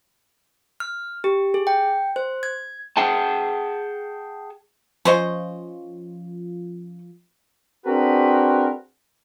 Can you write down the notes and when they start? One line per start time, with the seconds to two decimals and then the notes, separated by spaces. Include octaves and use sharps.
0.80 F6
1.24 G4
1.54 G#4
1.67 G5
2.16 C5
2.43 G#6
2.97 G#4 F#5 G5 A5
5.05 F3 C#4 F4 C5 D#5
7.86 C4 D4 F#4 G#4 A#4 B4